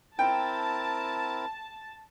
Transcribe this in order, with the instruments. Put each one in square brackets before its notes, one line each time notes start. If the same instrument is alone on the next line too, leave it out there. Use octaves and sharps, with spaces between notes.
[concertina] C4 E4 A#4 [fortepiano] G5 [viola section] A5